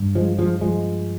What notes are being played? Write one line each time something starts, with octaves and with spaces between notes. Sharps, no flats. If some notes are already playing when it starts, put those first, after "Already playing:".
Already playing: G2
F3 G#3
F3 G#3
F3 G#3